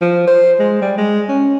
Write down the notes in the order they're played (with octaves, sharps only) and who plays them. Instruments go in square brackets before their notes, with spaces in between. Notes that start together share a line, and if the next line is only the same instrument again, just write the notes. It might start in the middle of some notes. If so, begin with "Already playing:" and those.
[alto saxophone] F3
C5
G#3
G3
G#3
C#4